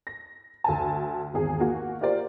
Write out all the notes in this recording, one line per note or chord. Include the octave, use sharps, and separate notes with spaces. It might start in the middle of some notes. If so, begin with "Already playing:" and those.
A#6
D2 G#5 A5
G#1 E2 G#4
A#3 F#4
F4 G4 A#4 C5 D5